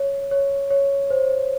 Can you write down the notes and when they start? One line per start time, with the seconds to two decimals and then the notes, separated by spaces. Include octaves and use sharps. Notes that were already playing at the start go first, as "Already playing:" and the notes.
Already playing: C#5
0.31 C#5
0.70 C#5
1.10 C5